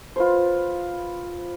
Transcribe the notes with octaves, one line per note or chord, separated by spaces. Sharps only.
F4 B4 C5